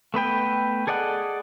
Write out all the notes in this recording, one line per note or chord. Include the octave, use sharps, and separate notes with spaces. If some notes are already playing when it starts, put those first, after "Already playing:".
A3 B3 B4 G5
G#4 A4 D5 D#5 F#5